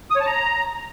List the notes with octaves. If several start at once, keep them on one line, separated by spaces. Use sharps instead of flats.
D#6
C#5
A5
A#5